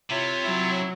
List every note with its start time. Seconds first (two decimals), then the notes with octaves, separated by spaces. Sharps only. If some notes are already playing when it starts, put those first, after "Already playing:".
0.10 C3 E4 F4 C#5 E5
0.44 F#3 E4